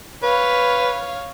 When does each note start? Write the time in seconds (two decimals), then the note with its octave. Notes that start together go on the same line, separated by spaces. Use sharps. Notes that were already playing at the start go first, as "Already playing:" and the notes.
0.23 B4 C#5 F5